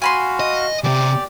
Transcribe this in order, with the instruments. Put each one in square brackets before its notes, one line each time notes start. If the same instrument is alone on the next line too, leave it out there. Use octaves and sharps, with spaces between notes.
[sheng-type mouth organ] F#4 F5 [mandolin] G#5 B5 C6
[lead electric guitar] D#5
[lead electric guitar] C#2 C3 [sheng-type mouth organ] G4 D5